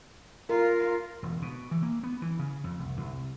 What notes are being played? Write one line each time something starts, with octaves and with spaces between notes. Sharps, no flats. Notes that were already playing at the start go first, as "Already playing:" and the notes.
F4 A#4
E1
B2
E3
A#3
B3
E3
C#3
F2
C2
C2